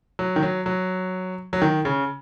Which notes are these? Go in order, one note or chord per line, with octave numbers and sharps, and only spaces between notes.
F#3
D#3
F#3
F#3
F#3
D#3
C#3